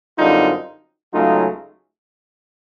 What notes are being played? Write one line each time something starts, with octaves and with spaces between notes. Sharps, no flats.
F#2 D3 G3 C4 D#4 F4
C#2 C#3 F#3 A3 D#4 F4